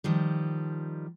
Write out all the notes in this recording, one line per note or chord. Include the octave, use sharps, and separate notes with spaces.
D#3 F3 G3